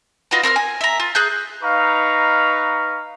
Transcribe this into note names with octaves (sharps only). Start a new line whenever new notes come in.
D#4 F4 F#4 B4
C4 A#4 D#6 F6
G#5
E5 A#5
F4
G#4 F#6 G6
D#4 B4 F5 A#5 C#6